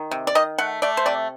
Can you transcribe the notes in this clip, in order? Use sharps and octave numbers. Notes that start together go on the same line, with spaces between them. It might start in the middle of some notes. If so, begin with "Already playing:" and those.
Already playing: D#3
C3
D5
D#3 D#5
A3 F#5
A3 D5
C5
C3 D5